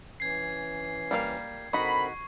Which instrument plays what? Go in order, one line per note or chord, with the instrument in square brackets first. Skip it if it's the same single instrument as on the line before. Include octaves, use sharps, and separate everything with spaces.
[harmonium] E3 C#4 [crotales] G#6 C7
[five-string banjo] G3 A#3 F5
[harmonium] D3 C4 A#4 [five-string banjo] D#4 F#4 [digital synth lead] B5 [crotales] C#6